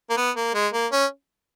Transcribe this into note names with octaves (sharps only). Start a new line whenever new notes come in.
A#3
B3
A#3
G#3
A#3
C#4